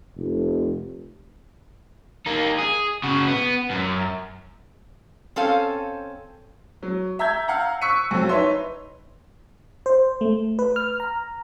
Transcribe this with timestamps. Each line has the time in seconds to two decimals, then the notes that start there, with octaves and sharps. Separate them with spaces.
0.17 F1
2.26 A#3 D#4
2.58 G#4
3.04 C#3 F#4
3.27 B3
3.71 F#2
5.36 C4 C#4 A4 F5
6.83 F#3
7.19 E5 A#5 E6 G6 G#6
7.48 F5 F#5 A#5
7.81 C#6 E6 F#6 B6 C#7 D#7
8.11 F2 F#3
8.29 D#4 B4 C#5 E5 C6
9.86 C5
10.21 A3
10.59 B4
10.76 F6
11.00 A#5